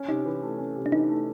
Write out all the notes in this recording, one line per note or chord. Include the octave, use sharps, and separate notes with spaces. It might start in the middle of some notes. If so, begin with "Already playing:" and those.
Already playing: C#4
C3 D#4
E3
A3
C#4
C3
D4
E3 D#4
A3